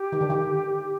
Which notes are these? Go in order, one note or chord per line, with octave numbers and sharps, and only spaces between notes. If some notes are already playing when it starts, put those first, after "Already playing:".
Already playing: G4
D#3
D3
D#3